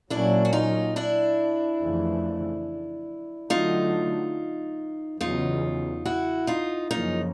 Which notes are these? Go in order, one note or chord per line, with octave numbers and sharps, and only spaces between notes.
A#2 F#3 A#3 C#4 D4 E4
F#4
D#4 F4
D4 E4
F2 C#3 E3 A3
D3 F#3 A3 D#4 F4
E2 C#3 F#3 D#4 F4
E4 F#4
D#4 F4
F#2 C#3 F3 A#3 D#4 F4